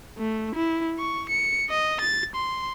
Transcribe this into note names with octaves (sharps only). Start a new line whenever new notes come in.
A3
E4
C#6
C#7
D#5
A6
C6